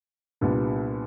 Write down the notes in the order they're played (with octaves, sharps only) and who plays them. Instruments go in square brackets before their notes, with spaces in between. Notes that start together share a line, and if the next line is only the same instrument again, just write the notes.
[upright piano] C2 A#2 G3 B3 D4